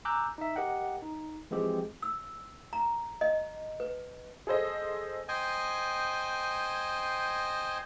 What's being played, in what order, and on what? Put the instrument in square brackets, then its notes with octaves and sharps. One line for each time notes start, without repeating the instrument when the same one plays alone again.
[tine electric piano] G#5 A#5 D6 E6 F#6 G6
D#4 E5
G4 A#4 D#5 F#5 G5
D#4
E3 F3 G#3 C4 G4 G#4
[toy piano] E6
A#5
D#5
B4
[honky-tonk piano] G#4 A4 C5 D#5
[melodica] C5 D#5 G5 G#5